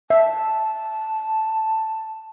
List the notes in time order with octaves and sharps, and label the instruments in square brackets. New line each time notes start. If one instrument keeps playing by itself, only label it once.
[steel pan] E5 [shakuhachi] A5